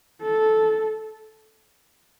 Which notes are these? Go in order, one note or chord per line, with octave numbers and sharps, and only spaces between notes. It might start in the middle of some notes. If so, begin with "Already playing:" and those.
A4